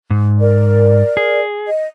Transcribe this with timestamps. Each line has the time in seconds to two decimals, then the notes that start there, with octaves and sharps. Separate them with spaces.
0.10 G#2
0.40 A#4 D5
1.17 G#4
1.67 D#5